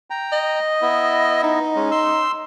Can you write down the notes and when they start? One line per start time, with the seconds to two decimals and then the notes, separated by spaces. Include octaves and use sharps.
0.10 G5 A#5
0.33 D#5
0.82 B3 E4
1.43 D#4
1.76 G#3 C#4
1.91 C6 E6